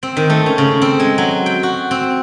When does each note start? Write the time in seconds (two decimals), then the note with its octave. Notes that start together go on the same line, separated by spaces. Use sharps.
0.03 C4
0.17 D#3
0.30 A3
0.46 C#4
0.58 C#3
0.82 C4
1.00 G#3
1.18 F#3
1.46 G5
1.63 F#4
1.91 C4